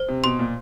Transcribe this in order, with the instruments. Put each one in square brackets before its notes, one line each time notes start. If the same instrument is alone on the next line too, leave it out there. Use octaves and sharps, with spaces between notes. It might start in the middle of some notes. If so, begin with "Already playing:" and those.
Already playing: [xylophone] C5
[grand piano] C3
[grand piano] B2 [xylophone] C6
[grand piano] A#2